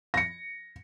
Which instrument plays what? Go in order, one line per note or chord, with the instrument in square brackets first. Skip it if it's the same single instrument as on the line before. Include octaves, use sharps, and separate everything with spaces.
[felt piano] A#6 C#7